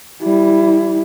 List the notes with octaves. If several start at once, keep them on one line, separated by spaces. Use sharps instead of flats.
G3 E4